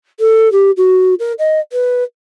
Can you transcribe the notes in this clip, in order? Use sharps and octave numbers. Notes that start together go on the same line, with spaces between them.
A4
G4
F#4
A#4
D#5
B4